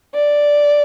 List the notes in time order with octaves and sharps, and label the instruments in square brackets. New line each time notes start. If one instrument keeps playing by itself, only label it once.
[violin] D5